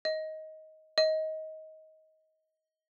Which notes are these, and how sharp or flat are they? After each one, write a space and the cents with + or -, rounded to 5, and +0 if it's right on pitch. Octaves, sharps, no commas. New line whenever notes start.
D#5 +15
D#5 +20